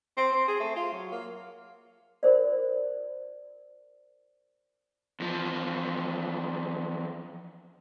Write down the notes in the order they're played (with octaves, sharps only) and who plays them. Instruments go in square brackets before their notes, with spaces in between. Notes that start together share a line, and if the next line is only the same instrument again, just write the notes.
[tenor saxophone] C4
C4
G#4
A3
F4
F#3
A#3
[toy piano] F4 A#4 C5 D5
[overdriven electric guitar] E2 F3